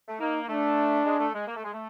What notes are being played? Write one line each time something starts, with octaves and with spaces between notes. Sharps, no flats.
A3
A#3 D#4
A3 D4
G#3
A3
G#3
A#3
A3
G#3
A3